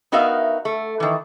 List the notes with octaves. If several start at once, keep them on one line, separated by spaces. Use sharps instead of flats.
B3 D#4 F#4 A#4 E5 F5
A3
D#3 E3